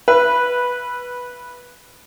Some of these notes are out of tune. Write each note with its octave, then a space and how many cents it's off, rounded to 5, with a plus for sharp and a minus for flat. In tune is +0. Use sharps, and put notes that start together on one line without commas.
B4 -5 E5 +35